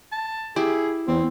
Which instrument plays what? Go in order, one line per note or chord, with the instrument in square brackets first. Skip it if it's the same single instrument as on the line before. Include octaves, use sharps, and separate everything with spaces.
[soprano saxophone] A5
[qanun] E4 [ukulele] G4 [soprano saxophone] G#4
[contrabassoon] E2 [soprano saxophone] C4